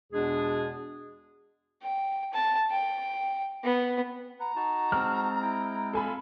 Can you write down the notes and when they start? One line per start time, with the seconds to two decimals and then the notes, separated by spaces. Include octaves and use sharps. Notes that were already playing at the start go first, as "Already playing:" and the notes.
0.12 E2 B2 G#3 D4 G#4
1.82 G5
2.33 A5
2.71 G5
3.64 B3
4.40 B4 F#5 A#5
4.56 D#4 F#4 A5
4.92 G#3 C4 F6
5.42 E4 G5
5.93 F4 A4 F5 G#5 B5